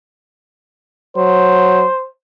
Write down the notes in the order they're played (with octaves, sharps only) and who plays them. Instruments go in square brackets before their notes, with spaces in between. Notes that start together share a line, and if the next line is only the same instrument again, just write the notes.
[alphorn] F#3 [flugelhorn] C5